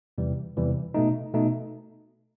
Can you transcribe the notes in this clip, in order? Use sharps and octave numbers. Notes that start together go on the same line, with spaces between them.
E2 C3 E3 G3
E2 C3 E3 G3
B2 A3 D#4
B2 A3 D#4